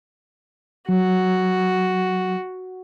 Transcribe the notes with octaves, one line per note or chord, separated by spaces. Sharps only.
F#3 F#4